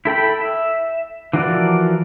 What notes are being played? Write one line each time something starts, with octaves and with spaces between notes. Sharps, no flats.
E4 A4 G5 B5
E5
E3 F3 F#4 A#4 D5